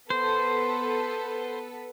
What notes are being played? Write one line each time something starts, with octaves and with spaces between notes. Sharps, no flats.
B3 A4 B4 C5